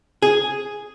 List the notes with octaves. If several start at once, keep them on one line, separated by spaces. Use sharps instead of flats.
G#4